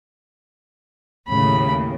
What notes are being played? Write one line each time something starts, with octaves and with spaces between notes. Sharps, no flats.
D#2 A2 C#3 B5